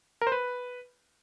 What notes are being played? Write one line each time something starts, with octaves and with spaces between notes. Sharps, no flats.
A#4
C5
B4